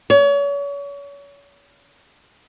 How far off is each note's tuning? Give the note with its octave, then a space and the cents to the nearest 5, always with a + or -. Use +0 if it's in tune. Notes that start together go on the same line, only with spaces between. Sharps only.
C#5 +35